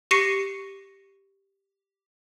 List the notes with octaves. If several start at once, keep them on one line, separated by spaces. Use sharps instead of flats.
G4 C#6 A#6 C7 C#7 D#7